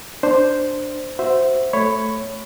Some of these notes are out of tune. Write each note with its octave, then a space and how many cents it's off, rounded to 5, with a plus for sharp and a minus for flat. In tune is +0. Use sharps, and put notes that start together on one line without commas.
D4 +5 C5 +0
F#4 +0 C5 -5 E5 +0
A3 +0 C#5 +0 B5 +10